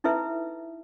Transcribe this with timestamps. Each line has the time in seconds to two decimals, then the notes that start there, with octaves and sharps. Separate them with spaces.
0.04 D#4 E4 A4 B4 E5